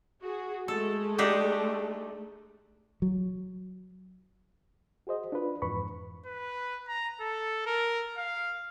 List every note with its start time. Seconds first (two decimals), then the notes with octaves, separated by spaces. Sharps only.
0.22 F#4 G#4
0.68 G#3 A3 A4
1.18 D4 D#4 G4
3.02 F#3
5.07 F#4 G#4 C5 D#5
5.32 D4 F4 B4
5.62 F2 G#2 E3 B4 B5 C#6
6.26 B4
6.88 A#5
7.21 A4
7.67 A#4
8.17 F5